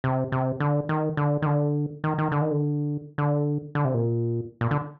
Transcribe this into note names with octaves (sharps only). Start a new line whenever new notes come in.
C3
C3
D3
D#3
D3
D#3
D3
D#3
D#3
D3
D#3
D3
D3
D3
C3
A#2
A#2
D3